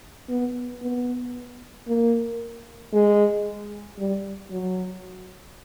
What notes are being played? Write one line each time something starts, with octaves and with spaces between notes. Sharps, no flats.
B3
B3
A#3
G#3
G3
F#3